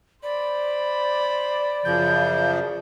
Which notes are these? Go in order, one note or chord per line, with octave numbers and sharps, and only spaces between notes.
C5 D5 B5
F#2 C#3 F3 G6